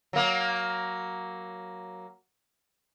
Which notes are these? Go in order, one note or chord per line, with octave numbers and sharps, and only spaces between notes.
F#3 A#3